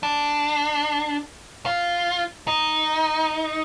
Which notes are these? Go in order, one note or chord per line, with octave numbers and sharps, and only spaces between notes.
D4
F4
D#4